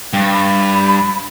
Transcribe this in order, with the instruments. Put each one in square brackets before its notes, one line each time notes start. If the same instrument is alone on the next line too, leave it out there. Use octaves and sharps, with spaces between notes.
[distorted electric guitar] G2 [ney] G5
[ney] B5